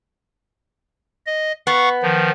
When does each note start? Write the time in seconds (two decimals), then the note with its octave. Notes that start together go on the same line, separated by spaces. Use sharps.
1.26 D#5
1.67 B3 F5 F#5 C#6
2.03 D#3 F3